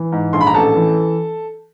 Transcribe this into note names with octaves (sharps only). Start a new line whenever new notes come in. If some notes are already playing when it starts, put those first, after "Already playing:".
Already playing: E3
G#2
A#1 C6
B5
A#5
A1 A4 A5
E3